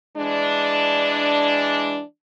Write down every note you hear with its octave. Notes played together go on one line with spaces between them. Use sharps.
E3 G#3 D4